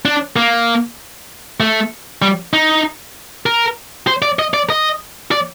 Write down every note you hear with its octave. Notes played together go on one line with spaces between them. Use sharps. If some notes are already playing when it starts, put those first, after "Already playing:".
D4
A#3
A3
G3
D#4
A#4
C5
D5
D#5
D5
D#5
D5